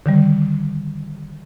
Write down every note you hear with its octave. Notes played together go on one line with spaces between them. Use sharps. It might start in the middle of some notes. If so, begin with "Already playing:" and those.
D3 D#3 G3